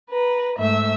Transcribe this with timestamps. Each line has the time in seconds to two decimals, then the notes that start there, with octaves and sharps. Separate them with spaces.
0.11 B4 A#5
0.58 G#2 A3 E5 E6